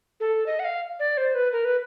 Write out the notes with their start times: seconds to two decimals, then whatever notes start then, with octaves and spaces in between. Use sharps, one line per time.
0.20 A4
0.46 D#5
0.59 F#5
0.64 F5
0.99 D5
1.17 C5
1.35 B4
1.52 A#4
1.65 B4